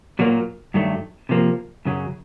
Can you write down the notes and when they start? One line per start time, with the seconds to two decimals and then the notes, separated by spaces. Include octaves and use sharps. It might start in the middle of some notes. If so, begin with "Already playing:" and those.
0.19 A#2 F#3 A#3
0.74 G2 D#3 F#3 A3
1.29 C3 F3 A#3
1.85 F#2 C#3 F#3